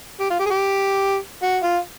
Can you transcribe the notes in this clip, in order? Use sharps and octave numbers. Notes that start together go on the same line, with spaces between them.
G4
F4
G4
G#4
G4
F#4
F4